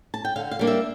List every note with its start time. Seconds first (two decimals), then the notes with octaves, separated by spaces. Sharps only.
0.14 A5
0.25 G5
0.36 D3 F5
0.51 F5
0.59 G3 A#3 D4
0.67 E5